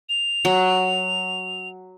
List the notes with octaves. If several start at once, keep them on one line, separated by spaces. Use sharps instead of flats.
F7
F#3